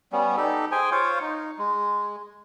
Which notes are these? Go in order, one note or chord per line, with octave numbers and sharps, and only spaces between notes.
G3 B3 C#4
D#4 G4 A4
G#4 C5 G5 G#5
F4 C5 C#5 F5
D#4
G#3